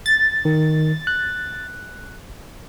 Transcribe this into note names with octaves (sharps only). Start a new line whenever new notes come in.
A6
D#3
F#6